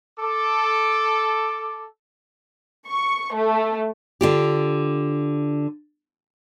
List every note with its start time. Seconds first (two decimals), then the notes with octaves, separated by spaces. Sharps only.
0.20 A4 D6
2.87 C#6
3.33 A3
4.21 D3 F4 G4